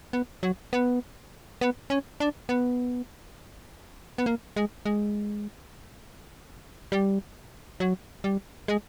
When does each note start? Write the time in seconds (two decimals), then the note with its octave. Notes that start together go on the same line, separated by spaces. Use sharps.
0.13 B3
0.43 F#3
0.73 B3
1.61 B3
1.90 C#4
2.20 D4
2.49 B3
4.18 B3
4.26 A#3
4.56 G#3
4.85 G#3
6.92 G3
7.80 F#3
8.24 G3
8.68 G#3